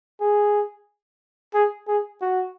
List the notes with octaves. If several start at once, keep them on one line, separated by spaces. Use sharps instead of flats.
G#4
G#4
G#4
F#4